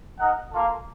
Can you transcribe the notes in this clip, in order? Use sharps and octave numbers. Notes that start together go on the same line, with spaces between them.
D#4 A#4 D#5 F#5
A#3 F4 A4